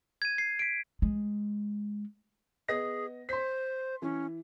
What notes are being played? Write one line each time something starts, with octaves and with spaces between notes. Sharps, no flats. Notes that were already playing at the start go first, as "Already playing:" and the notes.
G#6 D#7
C7
B6 D7
G#3
B3 G#4 D#5 A#6
C5 C6 B6
E3 C#4